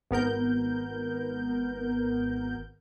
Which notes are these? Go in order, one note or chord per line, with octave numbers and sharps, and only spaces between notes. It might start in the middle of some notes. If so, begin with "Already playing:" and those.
G#1 B3 A#4 G6